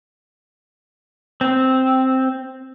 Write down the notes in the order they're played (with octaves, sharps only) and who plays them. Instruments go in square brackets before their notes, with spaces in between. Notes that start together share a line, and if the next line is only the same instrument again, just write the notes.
[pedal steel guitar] C4